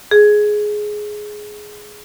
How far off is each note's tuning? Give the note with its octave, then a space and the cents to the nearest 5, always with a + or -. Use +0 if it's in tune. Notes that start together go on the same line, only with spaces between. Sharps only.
G#4 +10